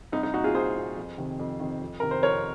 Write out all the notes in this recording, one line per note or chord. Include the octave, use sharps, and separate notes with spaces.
C2 D#4
D#4
A#2 D#4 F#4
F4 G#4
C2 G#4 C5
A#2
F2
C3 D#3
F2
C3 D#3
F2
C3 D#3 A#4
C5
F2 A#4 C#5